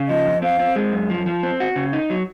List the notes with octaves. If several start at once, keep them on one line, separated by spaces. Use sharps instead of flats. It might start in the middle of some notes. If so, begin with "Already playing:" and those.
Already playing: C#3
F3 D#5
F2
C4 F5
C4
G#3
F#2
F3
F3
C4
F#4
C#3
D#4
F#3